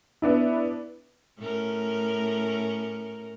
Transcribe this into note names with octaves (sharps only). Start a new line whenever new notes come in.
B3 D4 E4
A2 C#4 A#4